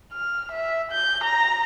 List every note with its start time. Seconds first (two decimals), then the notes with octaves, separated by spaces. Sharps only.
0.12 F6
0.52 E5
0.92 G6
1.24 A#5